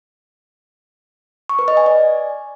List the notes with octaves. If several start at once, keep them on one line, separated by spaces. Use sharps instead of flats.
C#6
B4
D#5
G#5
D5